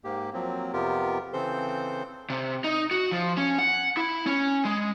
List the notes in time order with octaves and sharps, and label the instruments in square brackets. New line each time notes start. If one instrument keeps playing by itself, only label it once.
[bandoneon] G#2 A#3 G4
F3 F#3 A#3 C4
F2 C3 B3 F4 G4 A#4
C#3 E3 C4 A4 C5 G6
[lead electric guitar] C3
D#4
F#4
F3
C#4
F#5
E4
C#4
G#3